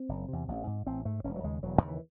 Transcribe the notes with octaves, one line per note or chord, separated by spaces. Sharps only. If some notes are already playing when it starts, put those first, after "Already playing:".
Already playing: C4
F#1
E2 C3
A1
G#2
A1 C4
G#2 A3
E1 C#4
F#3
D#2 C#3 G#3
E1 F#3
D#3
D#2 C#3
E3